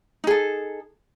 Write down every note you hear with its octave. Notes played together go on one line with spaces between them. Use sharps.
D#4 G#4 A4